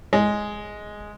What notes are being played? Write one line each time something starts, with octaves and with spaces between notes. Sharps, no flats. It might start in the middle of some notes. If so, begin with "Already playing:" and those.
G#3